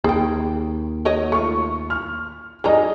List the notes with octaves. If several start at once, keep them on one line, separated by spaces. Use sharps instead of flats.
D#2 G#4 G5
F#4 C#5 D#5
A3 F4 C#6
F6
F#3 D#4 G#4 D5 D#5 A#5